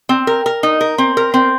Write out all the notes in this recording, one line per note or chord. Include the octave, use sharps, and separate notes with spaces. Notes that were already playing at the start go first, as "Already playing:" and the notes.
C4
A#4
A#4
D#4
A#4
C4
A#4
C4